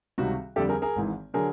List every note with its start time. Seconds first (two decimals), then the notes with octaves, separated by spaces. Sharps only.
0.18 C#2 C3 D#3 G3 F#4
0.56 F2 D3 G3 G4 A4
0.69 G#4 A#4
0.82 G#4 A#4
0.96 G#1 G#2 E3
1.34 D3 F#3 G#4 A#4